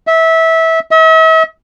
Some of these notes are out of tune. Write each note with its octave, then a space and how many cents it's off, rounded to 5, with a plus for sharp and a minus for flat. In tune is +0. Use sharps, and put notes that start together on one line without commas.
E5 -20
E5 -45